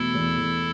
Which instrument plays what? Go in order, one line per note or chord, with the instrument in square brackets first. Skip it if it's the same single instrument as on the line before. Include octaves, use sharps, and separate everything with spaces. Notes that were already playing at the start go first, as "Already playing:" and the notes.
Already playing: [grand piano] E2 B2 A3 [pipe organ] E4 A4
[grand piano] E2
E2